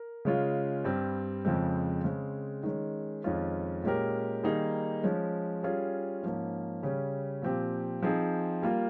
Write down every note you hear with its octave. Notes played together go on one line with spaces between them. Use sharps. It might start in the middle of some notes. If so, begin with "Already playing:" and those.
Already playing: A#4
C#3 G#3 C#4 F4
G2 G3 C4
F2 C#3 F3 G#3 C4
C#3 G#3 C4
D#3 G#3 C#4
F2 D#3 G#3 C#4 F4
A#2 G#3 C#4 G4 A#4
D#3 G3 A#3 D#4 G#4
F3 G#3 C#4
G3 C#4 F4 G#4
G#2 F3 A#3 C#4
C#3 G3 C#4
A#2 F3 C4 G4
F3 C4 D#4 G#4
G3 A#3 F4 A#4